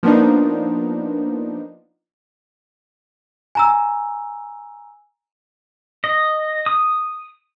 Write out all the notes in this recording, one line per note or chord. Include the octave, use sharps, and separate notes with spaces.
F3 A#3 B3 D4 D#4
G#5 A#5 E6
D#5
D#6